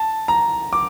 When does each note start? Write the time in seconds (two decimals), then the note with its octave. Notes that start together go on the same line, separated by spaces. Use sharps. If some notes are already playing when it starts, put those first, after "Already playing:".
Already playing: A5
0.28 A#5
0.73 D6